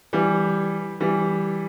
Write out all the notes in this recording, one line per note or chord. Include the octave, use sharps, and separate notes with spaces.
E3 G3
E3 G3